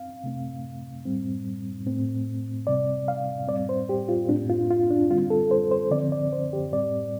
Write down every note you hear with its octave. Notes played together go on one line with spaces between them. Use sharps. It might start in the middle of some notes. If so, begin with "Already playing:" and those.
Already playing: C4 F5
C3 A3 C4
A2 G3 C4
A2 A3 C4
C3 G3 C4 D5
F5
A2 G3 C4 D5
C5
G4
F4
A2 A3 C4 D4
F4
F4
D4
D3 G3 C4 F4
A4
C5
C5
D3 F3 C4 D5
D5
C5
G4
A2 G3 C4 D5